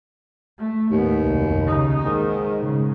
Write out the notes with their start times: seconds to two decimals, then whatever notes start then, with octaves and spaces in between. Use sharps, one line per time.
0.59 A3
0.92 D#2 A2 B3
1.24 C2 F#2
1.63 C#3 D#4
2.04 G#2 D#3
2.60 C#3 G#3